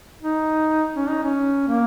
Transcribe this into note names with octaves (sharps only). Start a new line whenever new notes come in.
D#4
C#4
D#4
C#4
A#3